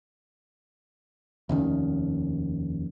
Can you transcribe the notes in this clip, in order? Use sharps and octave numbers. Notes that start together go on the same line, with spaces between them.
F1 D#2 D#3 C#4